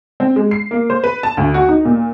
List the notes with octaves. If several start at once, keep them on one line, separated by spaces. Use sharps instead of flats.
C4
G#3
C7
A#3
C5
B4
A5
D2
F#4
D#4
A#2